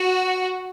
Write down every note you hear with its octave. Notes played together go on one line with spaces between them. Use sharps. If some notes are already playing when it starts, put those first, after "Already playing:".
Already playing: F#4